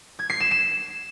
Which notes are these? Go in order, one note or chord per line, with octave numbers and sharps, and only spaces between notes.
G#6
C7
E7
E7